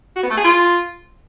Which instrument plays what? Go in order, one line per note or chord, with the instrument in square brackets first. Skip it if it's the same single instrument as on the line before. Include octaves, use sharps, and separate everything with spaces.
[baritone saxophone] F#4
B3
A3
G#4
F4